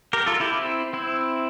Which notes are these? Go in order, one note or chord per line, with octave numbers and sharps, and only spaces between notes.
G4 A#4
F4 A4
E4 G4
C4 E4
C4 E4